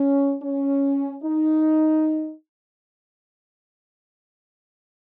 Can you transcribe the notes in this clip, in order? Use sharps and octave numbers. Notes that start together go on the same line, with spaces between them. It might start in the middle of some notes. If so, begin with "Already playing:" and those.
Already playing: C#4
C#4
D#4